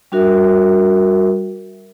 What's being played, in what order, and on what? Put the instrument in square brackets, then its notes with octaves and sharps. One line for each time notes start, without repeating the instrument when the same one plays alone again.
[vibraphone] G3 D4 F#4 A#4 E5